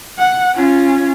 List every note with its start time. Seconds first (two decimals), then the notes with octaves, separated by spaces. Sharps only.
0.18 F#5
0.55 C#4 F4